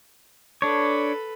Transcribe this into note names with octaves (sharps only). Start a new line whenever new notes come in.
D4 A4 B4 C#5